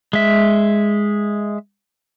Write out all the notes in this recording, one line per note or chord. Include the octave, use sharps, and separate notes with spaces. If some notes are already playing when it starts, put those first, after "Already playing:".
G#3 E5